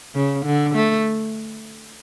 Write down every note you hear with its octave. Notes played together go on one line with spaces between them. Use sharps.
C#3
D3
A3